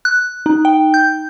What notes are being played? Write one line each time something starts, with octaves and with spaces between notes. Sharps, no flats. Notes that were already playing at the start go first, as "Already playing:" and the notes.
F#6
D#4
G5
G6